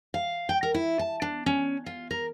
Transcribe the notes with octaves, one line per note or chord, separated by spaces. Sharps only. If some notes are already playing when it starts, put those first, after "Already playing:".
F5
G5
A#4
E4
A5
D4
C#4
F4
A#4